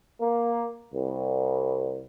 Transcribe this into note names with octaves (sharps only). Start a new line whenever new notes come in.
A#3
C2